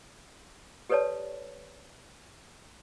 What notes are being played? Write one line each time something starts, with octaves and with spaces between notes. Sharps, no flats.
G4 A4 B4 C#5 D5 A5